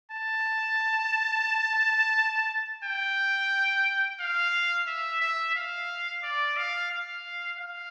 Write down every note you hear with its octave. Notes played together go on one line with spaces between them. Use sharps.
A5
G5
F5
E5
E5
F5
D5
F5
F5
F5